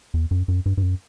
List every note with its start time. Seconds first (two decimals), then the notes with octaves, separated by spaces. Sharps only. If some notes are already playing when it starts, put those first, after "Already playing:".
0.14 E2
0.31 F#2
0.48 F#2
0.66 G2
0.77 G2
0.83 F#2